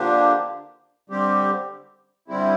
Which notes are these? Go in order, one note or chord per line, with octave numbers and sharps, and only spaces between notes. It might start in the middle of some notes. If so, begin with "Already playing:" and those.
Already playing: D3 F3 A#3 D4 G4
D3 G3 C4 G4
D3 G3 C4 E4